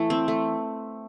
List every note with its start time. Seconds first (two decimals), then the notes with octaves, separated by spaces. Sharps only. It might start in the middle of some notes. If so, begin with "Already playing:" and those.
Already playing: E3 A3
0.10 C4
0.28 A3